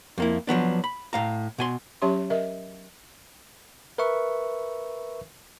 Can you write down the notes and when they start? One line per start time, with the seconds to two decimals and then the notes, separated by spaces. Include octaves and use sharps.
0.18 F2 A#3 E4
0.47 F3 F#3 B3 D4
0.84 B5
1.13 A2 F5 A#5
1.58 B2 G#5 C6
2.02 F#3 C#4 G4 C#5 E5 C6
2.30 A#4 D#5 E5
3.98 A#4 B4 E5 C#6